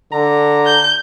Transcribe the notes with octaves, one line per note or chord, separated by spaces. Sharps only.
D3 A#5
G6